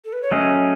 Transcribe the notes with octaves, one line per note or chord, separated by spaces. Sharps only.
A4
B4
C#5
F#3 A3 C#4 G#4 D#5